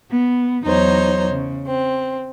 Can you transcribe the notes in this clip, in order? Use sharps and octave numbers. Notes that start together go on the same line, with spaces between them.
B3
E2 F#3 D#4 C5 C#5 A#5
C#3
C4